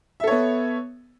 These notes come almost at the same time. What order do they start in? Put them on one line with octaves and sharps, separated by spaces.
E5 A4 C#5 B3